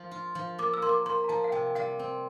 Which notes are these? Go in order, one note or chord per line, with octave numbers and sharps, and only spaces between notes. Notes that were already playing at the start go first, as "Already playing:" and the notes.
Already playing: F3
F4
F3
A#3 D6
E6
A#3 C6
D6
A#3 C6
A#5
F3 A5
F5
C3 G5
G5
G3 F5
C4